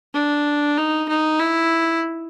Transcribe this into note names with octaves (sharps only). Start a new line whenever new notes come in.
D4
D#4
D#4
E4